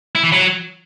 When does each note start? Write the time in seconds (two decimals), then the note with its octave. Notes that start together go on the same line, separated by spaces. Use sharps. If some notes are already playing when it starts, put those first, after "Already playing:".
0.15 E4
0.24 E3
0.32 F#3